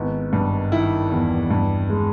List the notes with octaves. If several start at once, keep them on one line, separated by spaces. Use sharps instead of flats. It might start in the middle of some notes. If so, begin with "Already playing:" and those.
Already playing: G#1 B3 E4
G2
D#3 E4
E2
G2
G#3